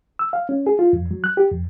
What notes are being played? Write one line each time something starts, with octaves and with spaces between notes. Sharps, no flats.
E6
F5
C#4
G#4
F4
F2
F#3
F#6
G4
F2